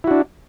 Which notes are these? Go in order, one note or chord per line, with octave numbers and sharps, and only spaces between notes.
D4 E4 F#4